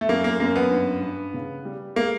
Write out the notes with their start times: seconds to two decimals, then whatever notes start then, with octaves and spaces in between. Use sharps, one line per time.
0.01 A3
0.09 F#2 A#3
0.24 A#3
0.40 F#2 A#3
0.56 B3
0.71 G2
1.02 G2
1.34 C#3
1.65 G3
1.96 G#3 A#3